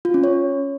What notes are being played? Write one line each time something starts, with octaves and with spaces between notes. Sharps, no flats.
F4
C#4
C#5